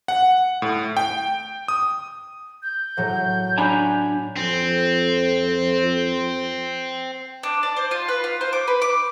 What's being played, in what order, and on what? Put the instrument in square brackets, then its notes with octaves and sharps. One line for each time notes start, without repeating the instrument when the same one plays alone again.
[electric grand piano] F#5
A2
G5
D#6
[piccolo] G6
[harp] A2 F#3
[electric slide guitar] D4 G#5 A#5 [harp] B5 F#6
[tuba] F2 [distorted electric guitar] C4
[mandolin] D4
D5
C5
F4
B4
F4
C5
D6
B4
D6